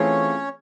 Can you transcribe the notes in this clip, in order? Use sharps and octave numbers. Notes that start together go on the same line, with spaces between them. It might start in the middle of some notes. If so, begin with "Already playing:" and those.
Already playing: E3 A3 C4 C#4 F4 G#4 C#5